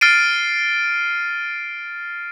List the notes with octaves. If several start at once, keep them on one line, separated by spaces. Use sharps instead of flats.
F6 A6 C7 D7 D#7